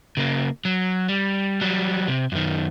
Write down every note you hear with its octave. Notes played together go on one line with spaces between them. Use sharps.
C#3 A#3
F#3
G3
F#3 G3
C3
F#2 D#3